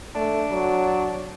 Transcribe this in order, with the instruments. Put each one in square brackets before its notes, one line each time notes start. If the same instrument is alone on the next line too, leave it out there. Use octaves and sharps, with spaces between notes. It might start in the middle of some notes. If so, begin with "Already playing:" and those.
[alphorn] A3 [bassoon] D4
[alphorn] F#3